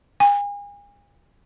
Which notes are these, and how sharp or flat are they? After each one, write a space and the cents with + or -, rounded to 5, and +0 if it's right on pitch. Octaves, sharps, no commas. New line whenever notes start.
G#5 -35